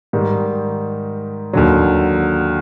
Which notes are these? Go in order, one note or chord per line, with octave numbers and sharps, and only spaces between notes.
G#2 D#3 G3
D#2 D3 F#3